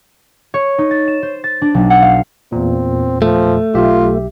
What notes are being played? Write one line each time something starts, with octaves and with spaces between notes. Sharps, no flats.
C#5
D#4
A6
E7
C5
A6
D4
B1
F#5
F5
E2 A#2 C4
F3 A3
B1 F4 G4 E5